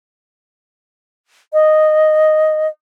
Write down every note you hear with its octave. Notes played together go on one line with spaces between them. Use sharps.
D#5